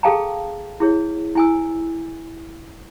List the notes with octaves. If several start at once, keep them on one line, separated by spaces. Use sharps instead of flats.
G#4 A4 F5 G5 A5 A#5
E4 G#4 C#5
E4 G#5 E6